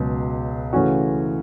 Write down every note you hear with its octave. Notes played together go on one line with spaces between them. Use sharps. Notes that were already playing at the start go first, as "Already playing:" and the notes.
Already playing: C#2 B2 F#3
C#3 E3 A3 C#4 F#4